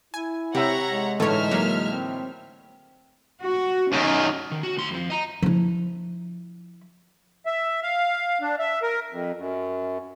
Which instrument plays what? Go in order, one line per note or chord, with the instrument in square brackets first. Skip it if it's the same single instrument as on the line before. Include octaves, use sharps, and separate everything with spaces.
[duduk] E4 [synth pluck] G#5
[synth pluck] C3 [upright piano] G4 E5 [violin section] C#5 F#5 A#5
[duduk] G#3
[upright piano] A2 D3 E3 [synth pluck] A3 C#5 [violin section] D#4 E5 F6
[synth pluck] F#3 A#3
[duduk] C4
[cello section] F#4
[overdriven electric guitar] F#2 D#3 [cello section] C#4
[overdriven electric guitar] D#3
F#4
D2 C6
F2 F3
D#5 A#5
[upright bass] F3 E4
[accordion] E5
F5
D4
E5
A#4
F2
F#2